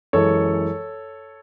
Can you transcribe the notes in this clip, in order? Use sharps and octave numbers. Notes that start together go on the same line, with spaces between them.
F#2 E3 G#3 A4 C#5